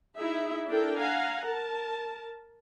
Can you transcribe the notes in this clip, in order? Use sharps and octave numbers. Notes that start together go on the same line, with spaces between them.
D#4 E4 G#4 E5
D4 E4 A4 A#4 G5
F5 F#5 G#5 A#5
A#4 A5